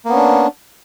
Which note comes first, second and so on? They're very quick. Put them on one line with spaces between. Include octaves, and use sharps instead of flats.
A#3 B3 C#4 D4